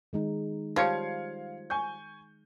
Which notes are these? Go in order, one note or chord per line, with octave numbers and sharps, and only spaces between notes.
D#3 G#3 D#4
F3 G3 C#5 F5 G#6 C#7
G#5 C#6 G6